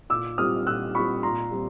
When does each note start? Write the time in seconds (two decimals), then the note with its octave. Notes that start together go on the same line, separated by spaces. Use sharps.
0.10 A#2 D6 E6
0.38 G3 C4 F4 D#6 F6
0.66 A#2 E6 F#6
0.95 G3 C4 F4 B5 C#6
1.23 A#2 A#5 C6
1.51 G3 C4 F4